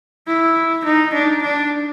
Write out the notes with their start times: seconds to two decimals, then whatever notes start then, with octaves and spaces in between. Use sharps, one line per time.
0.27 E4
0.85 D#4
1.13 D4
1.42 D4